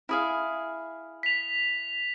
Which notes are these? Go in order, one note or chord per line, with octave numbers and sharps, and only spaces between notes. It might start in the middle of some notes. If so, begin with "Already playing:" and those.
E4 G#4 F5
B6 F7